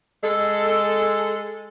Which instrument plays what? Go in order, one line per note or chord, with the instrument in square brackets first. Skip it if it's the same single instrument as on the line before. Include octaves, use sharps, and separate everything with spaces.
[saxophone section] G#3 A4